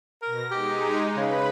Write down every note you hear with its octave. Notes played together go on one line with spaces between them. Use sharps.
B2 A#4 A#6
G#3 D#4 G4
C#3 B4 B5